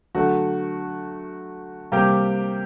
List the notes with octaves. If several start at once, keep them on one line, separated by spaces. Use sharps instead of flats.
D3 F#3 A3 F#4
C3 G3 A#3 G4